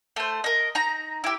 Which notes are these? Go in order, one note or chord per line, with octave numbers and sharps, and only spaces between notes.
A3 C5
A#4 D#5
D#4 A#5
E4 G4